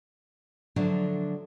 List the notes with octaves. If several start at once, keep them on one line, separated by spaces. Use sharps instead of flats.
D3 F3 F#3 A3 D4